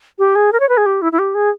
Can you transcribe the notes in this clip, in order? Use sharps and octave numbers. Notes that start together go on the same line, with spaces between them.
G4
G#4
A#4
C#5
B4
G#4
G4
E4
E4
G4
G#4